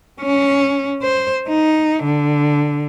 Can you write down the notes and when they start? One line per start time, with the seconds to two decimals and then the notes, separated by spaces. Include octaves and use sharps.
0.20 C#4
1.02 C5
1.48 D#4
2.04 D3